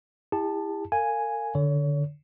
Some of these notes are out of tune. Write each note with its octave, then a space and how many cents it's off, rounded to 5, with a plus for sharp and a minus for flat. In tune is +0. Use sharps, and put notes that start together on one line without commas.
E4 +0 G4 +45 A5 +0
A#4 -40 F5 +0 G#5 +0
D3 +0 C#5 +30